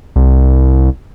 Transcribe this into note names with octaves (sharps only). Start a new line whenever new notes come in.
C2